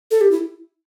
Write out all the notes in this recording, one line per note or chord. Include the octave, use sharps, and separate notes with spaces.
A4
G4
E4